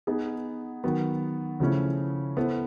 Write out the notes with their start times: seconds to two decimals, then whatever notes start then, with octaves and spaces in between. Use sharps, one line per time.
0.07 B3 D#4 G#4
0.84 D#3 F#3 B3
1.60 C#3 F3 A3 C#4 E4
2.37 B3 E4 A4 C5